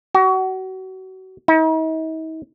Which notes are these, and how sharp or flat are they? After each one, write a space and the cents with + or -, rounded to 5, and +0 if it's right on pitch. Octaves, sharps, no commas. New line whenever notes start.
F#4 +30
D#4 +45